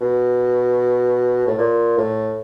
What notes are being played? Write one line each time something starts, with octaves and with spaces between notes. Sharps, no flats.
B2
A2
A#2
A2